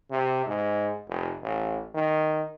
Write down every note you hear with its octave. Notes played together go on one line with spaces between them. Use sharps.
C3
G#2
F1
A1
D#3